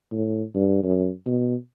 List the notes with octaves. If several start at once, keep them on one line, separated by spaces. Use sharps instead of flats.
A2
G2
F#2
B2